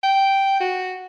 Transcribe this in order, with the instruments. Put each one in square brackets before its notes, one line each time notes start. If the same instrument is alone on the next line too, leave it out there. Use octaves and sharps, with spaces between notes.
[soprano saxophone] G5
F#4